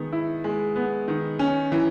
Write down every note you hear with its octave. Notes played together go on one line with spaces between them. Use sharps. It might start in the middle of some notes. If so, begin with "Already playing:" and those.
Already playing: D#3 G#3 B3
E4
G#3
B3
D#3
C#4
E3